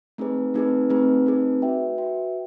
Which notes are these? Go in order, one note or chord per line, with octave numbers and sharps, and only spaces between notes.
A3 C4 D#4 G#4 B4
A3 C4 D#4 G#4 B4
A3 C4 D#4 G#4 B4
A3 C4 D#4 G#4 B4
F#4 B4 E5 G5
F#4 B4 E5 G5